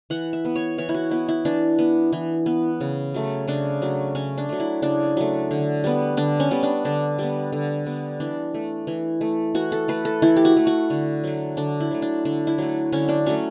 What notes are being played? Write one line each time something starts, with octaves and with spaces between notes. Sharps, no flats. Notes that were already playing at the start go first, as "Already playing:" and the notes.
E3 F#5
E5
B3
C#5
E3 C#5
E4
F#4
B3 E4
E4
E3 D4
B3
E3
B3
C#3
F#3 A3
C#3 D4
F#3 A3
C#3 C#4
D4
F#3 A3
E4
C#3 D4
F#3 A3
D3
G3 B3
D3 D4
C#4
G3 B3
D4
D3 D4
G3 B3
D3
G3 B3
E3 D4
A3
E3
A3
E3 F#4
A4
A3 B4
A4
E3 E4
G4
F#4
A3
F#4
D3
F#3 A3
D3 D4
E4
F#3 A3
D4
D3 D4
E4
F#3 A3
D3 C#4
D4
F#3 A3 C#4